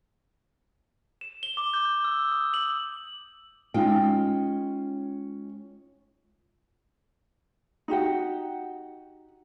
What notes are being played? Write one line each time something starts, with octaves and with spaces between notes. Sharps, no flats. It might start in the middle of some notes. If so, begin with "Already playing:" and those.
E7
G7
D6
G6
E6
D#6
F#7
G#3 C#4 D#4 F4 G5
D#4 F#4 G4 F#5